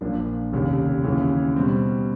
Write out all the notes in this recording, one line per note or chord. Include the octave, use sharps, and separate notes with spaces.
A#1 A#2 F3 A#3 D4
F1 D#2 C#3
D#2 C#3 E3
B2 G3 C4